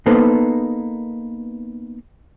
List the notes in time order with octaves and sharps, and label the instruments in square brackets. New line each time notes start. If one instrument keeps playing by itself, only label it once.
[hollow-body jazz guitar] A#3 B3 D#4 A4 B4 C5